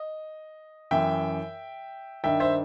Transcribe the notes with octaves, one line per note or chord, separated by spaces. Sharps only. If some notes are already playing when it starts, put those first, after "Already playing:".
Already playing: D#5
F#2 E3 E5 G5
G2 D#3 E5 G5
C5 E5